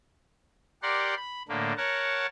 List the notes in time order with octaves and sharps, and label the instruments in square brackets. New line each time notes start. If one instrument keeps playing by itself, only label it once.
[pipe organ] G4 A#4 D5 F#5 C6
B5
A2 D3 A3 A#3
A#4 C#5 F#5 A5